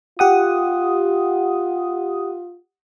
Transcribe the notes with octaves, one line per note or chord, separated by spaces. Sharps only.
F4 G4 F#5 D#6